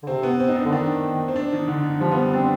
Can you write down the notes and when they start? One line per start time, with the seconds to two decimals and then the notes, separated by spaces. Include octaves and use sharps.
0.02 D3
0.07 C3 C4
0.23 B3
0.40 C4
0.48 D#4
0.56 D4
0.65 D3
0.72 D#3 D4
1.28 C4
1.36 D4
1.53 D#3
1.68 D3
1.84 D#3
2.01 F3 G3
2.12 B3
2.16 C4
2.33 C4 D4